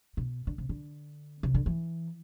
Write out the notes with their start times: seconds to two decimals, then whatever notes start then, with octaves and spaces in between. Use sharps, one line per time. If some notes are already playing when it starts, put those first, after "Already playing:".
0.17 B2
0.47 D3
0.58 C3
0.69 D3
1.43 C3
1.54 D3
1.66 E3